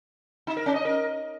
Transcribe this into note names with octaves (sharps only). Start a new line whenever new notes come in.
D#4
A#4
C#4
D#5
A#4